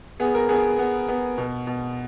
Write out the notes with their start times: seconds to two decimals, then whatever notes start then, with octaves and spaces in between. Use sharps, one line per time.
0.20 B3 G#4
0.34 A#4
0.49 B3 G#4
0.78 B3
1.09 B3
1.38 B2
1.67 B2